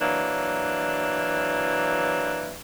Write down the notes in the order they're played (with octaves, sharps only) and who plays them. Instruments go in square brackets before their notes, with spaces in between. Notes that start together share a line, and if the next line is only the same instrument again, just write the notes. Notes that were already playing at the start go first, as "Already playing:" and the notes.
[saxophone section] E3 F#3 A#3 D4